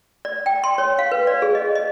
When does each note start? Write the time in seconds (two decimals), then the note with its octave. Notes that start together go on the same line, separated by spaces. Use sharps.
0.25 D5
0.46 G5
0.64 C6
0.78 C#5
0.99 F5
1.12 B4
1.27 D5
1.42 G#4
1.55 D#5
1.75 D#5